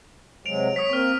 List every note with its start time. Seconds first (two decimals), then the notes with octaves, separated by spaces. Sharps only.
0.46 C3 F#3 G#3 D7 F7
0.76 C#5 D#6 B6
0.90 A#3 C4 C#6 F6